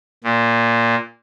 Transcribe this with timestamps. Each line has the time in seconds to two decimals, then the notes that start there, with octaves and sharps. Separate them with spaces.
0.24 A#2